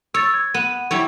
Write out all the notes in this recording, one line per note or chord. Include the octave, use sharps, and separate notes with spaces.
C#5 E6 A6
G#6
B3 D#7
G3 E4 C#5